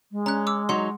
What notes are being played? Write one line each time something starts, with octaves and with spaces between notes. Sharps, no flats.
G#3
C#4 A#5 F#6
D6 E6
F#3 D#4 F#5 C6